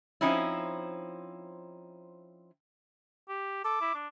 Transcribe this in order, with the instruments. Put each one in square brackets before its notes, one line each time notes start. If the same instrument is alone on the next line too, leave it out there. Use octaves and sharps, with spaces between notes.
[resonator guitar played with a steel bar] F3 C4 C#4 D#4 E4
[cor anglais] G4
[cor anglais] A4 [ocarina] D6
[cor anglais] E4
D4